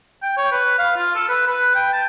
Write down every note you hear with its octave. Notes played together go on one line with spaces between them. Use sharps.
G5
C#5
B4
F5
F4
A4
B4
B4
G5
A5